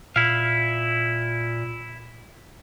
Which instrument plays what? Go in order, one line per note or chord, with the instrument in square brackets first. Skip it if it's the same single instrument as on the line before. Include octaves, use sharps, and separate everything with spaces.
[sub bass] A#2 [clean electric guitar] E4 F5